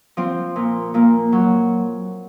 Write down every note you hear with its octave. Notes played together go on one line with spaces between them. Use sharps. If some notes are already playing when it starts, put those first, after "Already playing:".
F3 C4
A#2
A#2 A#3
F#3